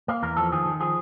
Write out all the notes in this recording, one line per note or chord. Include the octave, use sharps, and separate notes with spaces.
A#3
E2 A#4
F3 A4
D#3 G#4
D#3
F3 G#4